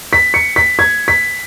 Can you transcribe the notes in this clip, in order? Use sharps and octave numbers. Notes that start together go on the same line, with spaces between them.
B6
C#7
B6
G#6
B6